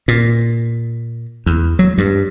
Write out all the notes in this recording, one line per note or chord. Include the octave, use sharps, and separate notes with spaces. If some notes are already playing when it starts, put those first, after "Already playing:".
A#2
E2
F#3
G2